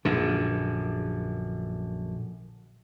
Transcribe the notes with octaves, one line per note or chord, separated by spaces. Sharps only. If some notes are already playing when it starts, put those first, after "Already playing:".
A#1 F#2 D3